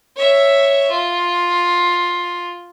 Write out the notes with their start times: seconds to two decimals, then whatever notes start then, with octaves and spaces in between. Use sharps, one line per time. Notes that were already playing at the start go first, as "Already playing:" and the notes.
0.16 C#5 E5
0.90 F4